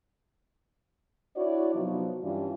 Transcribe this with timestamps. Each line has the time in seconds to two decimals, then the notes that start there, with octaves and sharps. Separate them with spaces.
1.36 D4 E4 F#4 C#5 D5
1.75 C3 F3 F#3 B3 D#4 F#4
2.22 G2 E3 G3 C#4 D4 F4